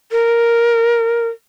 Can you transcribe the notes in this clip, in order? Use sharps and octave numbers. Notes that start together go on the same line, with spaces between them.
A#4